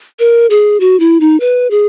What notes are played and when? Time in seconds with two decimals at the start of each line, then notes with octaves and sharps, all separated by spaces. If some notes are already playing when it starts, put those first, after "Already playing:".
0.19 A#4
0.50 G#4
0.80 F#4
1.00 E4
1.20 D#4
1.40 B4
1.71 G#4